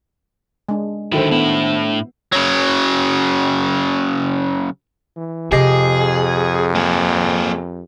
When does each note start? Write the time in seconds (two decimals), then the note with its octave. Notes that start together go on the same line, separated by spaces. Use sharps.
0.69 G#3 D4
1.12 D3 D#3 D4 E4 F#4 A4 C5
1.31 A2 B3 E4
2.33 C#3 F#3
5.16 E3
5.52 F2 C3 G4 G#4 D#5 C7
6.75 A#3 G#4